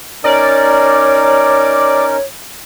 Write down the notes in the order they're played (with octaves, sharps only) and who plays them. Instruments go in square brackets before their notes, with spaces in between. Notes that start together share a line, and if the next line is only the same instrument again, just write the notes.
[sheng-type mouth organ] C#4 D#4 A#4 [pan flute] C#5 [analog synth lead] D5